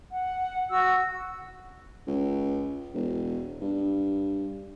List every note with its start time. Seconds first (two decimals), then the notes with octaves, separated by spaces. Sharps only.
0.11 F#5
0.69 F#4 E6
2.07 C#2
2.95 E1
3.61 G2